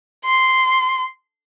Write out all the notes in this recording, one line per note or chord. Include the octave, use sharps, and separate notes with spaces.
C6